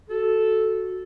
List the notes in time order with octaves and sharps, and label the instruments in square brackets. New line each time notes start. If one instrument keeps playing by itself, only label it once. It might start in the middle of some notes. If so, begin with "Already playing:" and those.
[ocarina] F#4 [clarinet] A4